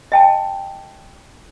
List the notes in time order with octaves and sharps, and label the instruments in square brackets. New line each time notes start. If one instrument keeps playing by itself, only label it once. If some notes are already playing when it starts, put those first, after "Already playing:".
[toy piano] D#5 G5 A5